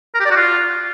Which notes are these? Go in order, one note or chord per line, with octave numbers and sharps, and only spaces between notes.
A#4
G4
D5
F#4
F4